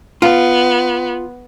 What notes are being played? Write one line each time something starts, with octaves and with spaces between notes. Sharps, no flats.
B3 F4